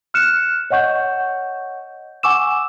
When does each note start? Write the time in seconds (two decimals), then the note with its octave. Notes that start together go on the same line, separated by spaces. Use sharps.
0.14 F6 F#6 C#7 E7
0.70 C#5 D#5 F#5 C#6 G6
2.23 F#5 G#5 C#6 D6 E6 E7